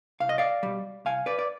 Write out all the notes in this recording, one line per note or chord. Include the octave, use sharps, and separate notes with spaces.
C2 F5
D#5
D5 F5
B2 G3
C2 F5 G#5
B4 D5
D5